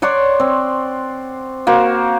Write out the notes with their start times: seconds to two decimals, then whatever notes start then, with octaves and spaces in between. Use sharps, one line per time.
0.02 C#5 D5 F#5 C6
0.40 C4
1.67 A#3 F#4 C5